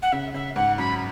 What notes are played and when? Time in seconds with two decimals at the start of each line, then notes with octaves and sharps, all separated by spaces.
0.02 F#5
0.12 C#3 E5
0.34 C#3 E5
0.56 G#2 F#5
0.78 F#2 B5